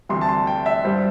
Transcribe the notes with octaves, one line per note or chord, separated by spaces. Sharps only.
D2 C3 E3 G3 C6
A5
C6
G5
E5
G2 G3 C5